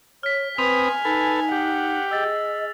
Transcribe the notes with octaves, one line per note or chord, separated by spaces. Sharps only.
C#5 F6 B6
C4 B4 G#5 B5 D#6 F7
D#4 A4 B4
G4 F#5
G#4 D#5 E6 A6